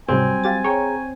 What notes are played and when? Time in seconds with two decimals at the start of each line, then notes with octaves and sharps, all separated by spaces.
0.08 C#2 G#2 C3 F#3 G3 C4 G#5
0.44 F4 G4 A6
0.64 G#4 C#5 G5 A#5